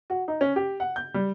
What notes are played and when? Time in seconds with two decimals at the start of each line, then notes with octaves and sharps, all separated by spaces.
0.10 F#4
0.28 D#4
0.41 C#4
0.56 G4
0.80 F#5
0.96 G6
1.14 G3